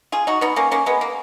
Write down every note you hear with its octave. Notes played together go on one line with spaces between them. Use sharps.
F4 G#4
D#4 F#4
B3 D#4
A#3 C#4
A#3 C#4
G#3 B3
A#3